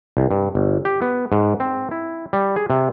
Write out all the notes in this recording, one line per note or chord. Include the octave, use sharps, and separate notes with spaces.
C2
G2
G1
G4
B3
G#2
C4
E4
G3
G#4
C3